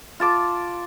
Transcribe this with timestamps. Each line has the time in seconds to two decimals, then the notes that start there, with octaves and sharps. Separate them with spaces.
0.20 F4 A5 D6